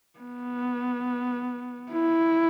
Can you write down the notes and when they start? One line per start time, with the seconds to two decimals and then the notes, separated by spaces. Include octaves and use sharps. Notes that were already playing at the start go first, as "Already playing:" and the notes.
0.19 B3
1.91 E4